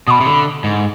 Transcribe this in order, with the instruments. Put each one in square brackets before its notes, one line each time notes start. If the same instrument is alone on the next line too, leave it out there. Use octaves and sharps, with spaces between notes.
[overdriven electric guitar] B2 [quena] B5 D#6
[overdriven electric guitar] C3
D3
G#2